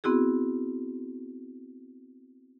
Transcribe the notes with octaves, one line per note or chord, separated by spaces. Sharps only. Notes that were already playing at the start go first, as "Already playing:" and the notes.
B3 C4 E4 F#4 G#4